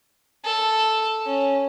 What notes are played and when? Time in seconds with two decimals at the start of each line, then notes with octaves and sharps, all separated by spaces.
0.45 A4
1.25 C#4